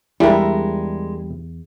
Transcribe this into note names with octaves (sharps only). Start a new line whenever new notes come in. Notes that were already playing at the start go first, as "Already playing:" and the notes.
E2 G3 G#3 D4 E4 A#4